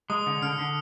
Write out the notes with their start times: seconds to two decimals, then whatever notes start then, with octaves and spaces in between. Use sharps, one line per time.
0.10 G#3 D#6
0.26 D3
0.42 D3 F6
0.59 D3